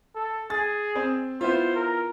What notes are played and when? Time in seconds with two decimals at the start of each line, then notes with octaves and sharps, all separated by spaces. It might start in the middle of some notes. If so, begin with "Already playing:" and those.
0.15 A4
0.50 G#4 A6
0.95 C4 C5
1.41 B3 E4 F4 C5
1.76 A#4